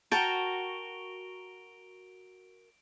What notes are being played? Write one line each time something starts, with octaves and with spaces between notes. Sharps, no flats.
F#4 A#4 G5 A5 D7 F7 G7